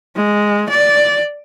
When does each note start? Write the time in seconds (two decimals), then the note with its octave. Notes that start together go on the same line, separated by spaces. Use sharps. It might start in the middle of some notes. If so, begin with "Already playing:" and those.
0.16 G#3
0.70 D5